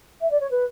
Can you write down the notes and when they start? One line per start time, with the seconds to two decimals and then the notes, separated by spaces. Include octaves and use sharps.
0.20 E5
0.30 D5
0.40 C#5
0.50 B4